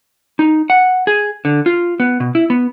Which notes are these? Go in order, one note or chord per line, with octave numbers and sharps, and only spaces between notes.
D#4
F#5
G#4
D3
F4
B3
B2
E4
B3